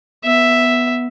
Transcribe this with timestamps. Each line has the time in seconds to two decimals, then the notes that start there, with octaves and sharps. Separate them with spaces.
0.24 B3 E5